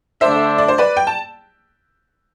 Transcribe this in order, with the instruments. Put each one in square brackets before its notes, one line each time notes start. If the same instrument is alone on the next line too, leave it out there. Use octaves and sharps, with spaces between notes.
[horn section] D3 A3 D4 [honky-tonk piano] C5 E5
[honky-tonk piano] D5
C5
B4 D5
G5
A5